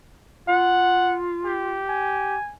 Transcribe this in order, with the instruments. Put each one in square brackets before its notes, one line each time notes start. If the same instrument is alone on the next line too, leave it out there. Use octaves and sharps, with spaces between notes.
[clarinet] F4 [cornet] F#5
[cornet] G4
[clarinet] G#5